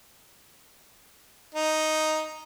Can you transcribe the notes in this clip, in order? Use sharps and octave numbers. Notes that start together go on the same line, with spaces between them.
D#4